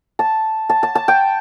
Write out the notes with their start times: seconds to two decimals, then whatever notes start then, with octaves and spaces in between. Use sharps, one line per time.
0.19 A5
0.70 A5
0.83 A5
0.95 A5
1.08 G5